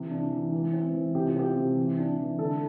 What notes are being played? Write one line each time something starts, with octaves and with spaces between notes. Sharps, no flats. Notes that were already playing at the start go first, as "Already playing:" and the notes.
Already playing: C3 E3
D4
E3
E3
C4
E3
C3 G4
F4
C4 G4
C3
E3
D4
E3
D3 A4